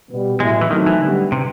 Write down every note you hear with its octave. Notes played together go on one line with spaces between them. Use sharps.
B2 G3 B3
A2 F#3 G#3 B3 E4
E3
D#3 F#3 A3 C4 D#4
E3
D3 G3 B3
C3